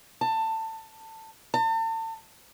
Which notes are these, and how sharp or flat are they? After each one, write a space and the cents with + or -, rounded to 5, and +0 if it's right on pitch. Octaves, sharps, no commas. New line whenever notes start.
A5 +20
A5 +40